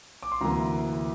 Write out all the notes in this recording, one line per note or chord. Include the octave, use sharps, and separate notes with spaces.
D6
C6
D2 C3 E3 A#3 A#5